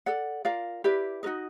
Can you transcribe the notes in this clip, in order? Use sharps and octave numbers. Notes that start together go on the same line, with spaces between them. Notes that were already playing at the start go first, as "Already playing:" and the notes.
A4 D5 F#5
F4 A#4 D5 F5
E4 G4 B4 D5
D#4 F#4 A#4 D#5